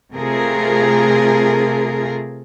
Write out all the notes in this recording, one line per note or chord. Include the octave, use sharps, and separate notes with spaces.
C3 A3 F4 G#4 A#4